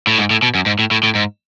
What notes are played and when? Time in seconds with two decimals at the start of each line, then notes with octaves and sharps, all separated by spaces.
0.07 A2
0.18 G#2
0.31 A2
0.43 B2
0.55 F#2
0.66 G#2
0.79 A2
0.91 A2
1.03 A2
1.15 G#2